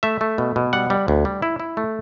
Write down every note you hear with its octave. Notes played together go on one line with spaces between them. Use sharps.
A3 E5
A3
B2
B2
G3 F#5
G3
D2
G3
E4
E4
A3